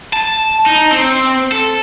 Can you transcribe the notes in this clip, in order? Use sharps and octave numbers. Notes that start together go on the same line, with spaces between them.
A5
D#4
C4
A4